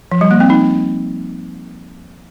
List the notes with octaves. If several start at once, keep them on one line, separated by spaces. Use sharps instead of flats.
F3
G3
A#3
C4
D#4